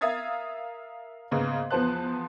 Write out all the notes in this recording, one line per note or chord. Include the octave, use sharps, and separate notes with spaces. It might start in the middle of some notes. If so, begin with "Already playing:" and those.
A#4 E5 F5 D#6 G#6 A6
G#2 C#3 A#3 B3
E2 F3 B3 C5 A5 F#6